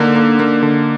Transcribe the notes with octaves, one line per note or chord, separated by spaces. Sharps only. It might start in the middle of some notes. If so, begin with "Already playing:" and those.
Already playing: D3 A#3 D#4
A#3
A#3
D3